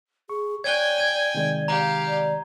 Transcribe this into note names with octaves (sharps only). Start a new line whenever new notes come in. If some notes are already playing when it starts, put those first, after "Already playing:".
G#4 C#6
C#5 D5 G5 G#5 F#6 G#6 G7
G#6 D#7
C3 D#3 G#3
G4 F5 A#5
D5